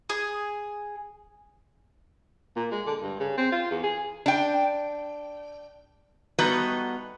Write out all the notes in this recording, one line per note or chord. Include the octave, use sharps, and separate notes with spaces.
G#4
A#2
G#3
D3
G2
C#3
C4
F4
E2
G#4
D4 G5
G3 A3 B3 D#4 F#4 B4